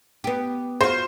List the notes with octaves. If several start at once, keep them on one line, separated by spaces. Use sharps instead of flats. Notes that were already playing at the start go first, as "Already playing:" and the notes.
B3 G4
F4 F#4 C5